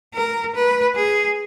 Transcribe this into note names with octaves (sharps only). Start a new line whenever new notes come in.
A#4
B4
G#4